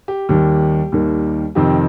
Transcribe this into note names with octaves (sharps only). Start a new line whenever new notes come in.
G4
D#2 D#3 G3 A#3 G4
D#2 D#3 G3 A#3
F2 C3 D#3 C4 G4